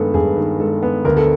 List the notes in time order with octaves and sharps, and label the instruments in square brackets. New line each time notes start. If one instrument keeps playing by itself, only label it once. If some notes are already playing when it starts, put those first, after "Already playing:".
Already playing: [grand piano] G2 D#3 G#3 B3 [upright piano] A4
[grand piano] G2 [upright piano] G#4
[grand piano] D#3
[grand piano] G#3 [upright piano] A4
[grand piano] B3
[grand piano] D2 [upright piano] A#4
[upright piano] A4